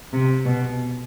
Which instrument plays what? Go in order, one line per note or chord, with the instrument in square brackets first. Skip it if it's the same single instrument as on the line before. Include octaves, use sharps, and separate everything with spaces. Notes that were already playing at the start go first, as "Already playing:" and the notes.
[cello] C3
B2